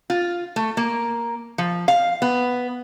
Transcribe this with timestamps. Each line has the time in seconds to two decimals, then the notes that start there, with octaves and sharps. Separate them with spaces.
0.10 F4
0.56 A3
0.77 A#3
1.58 F3
1.88 F5
2.22 B3